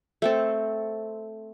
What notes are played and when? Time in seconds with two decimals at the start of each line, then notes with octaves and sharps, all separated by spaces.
0.22 A3 C4 A4